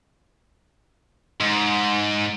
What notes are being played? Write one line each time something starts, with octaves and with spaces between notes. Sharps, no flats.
G#2